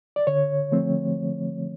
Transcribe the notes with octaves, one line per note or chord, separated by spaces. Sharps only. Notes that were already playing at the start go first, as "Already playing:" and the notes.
D5
D3 C#5
F3 A3 C4